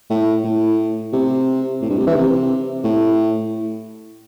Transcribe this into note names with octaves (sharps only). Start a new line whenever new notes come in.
A2
A2
C3
A2
G2
C3
E3
C3
A2